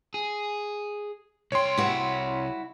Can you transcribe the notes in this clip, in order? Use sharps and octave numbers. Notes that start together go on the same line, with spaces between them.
G#4
C2 C#5 G5 C6
E4 F#4